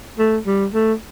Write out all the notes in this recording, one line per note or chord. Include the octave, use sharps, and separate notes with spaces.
A3
G3
A3